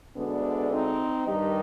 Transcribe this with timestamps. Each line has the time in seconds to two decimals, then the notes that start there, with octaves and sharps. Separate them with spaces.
0.16 D2 D3 G#3 B3 D4
0.72 C4 D#4
1.27 G2 D#3 G3 D#4 G4